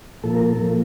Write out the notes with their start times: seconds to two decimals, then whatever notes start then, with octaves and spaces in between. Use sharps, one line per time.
0.24 A#2 F3 A#3 A4
0.35 A#4
0.46 A4
0.60 A#2 F3 A#3